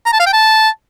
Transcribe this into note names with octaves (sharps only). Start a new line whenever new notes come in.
A#5
A5
F5
G5
A5